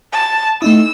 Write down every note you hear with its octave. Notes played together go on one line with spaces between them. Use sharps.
A5
A3 D#4 E4 E6